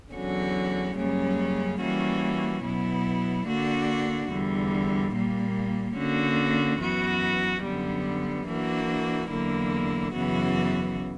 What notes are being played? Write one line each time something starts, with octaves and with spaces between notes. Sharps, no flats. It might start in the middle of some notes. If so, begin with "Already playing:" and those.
E2 D3 F#3 C#4 F#4
F#2 C#3 G3 A#3 C#4
E3 G3 A#3 C#4 F#4
B2 F#3 B3 E4
D3 A#3 D4 F#4
E2 D3 G3
A#2 G3 A#3
D3 A#3 C#4 F#4
F#2 E3 B3 F#4
F#2 D3 G3 B3
E3 A#3 D4 F#4
E2 D3 F#3 A#3 E4
F#2 C#3 E3 B3 F#4